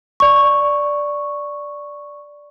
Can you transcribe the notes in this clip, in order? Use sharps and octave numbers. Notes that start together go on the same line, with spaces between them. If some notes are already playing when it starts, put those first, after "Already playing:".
D5 C#6